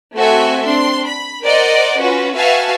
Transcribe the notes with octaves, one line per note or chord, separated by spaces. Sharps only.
A3 C4 F#4 A4 E5 G#5
C4 D4 C6
B5
A#4 C5 D5 D#5 F#5
C#4 F4 F#4 B4
F#4 B4 E5 F5 G#5 A5